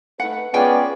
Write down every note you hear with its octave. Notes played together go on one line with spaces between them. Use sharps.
A3 D#4 B4 F#5
G#3 B3 C#4 F4 D5 G5 G#5